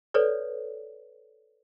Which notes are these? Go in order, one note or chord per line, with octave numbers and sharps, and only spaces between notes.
A4 B4 C#5 D5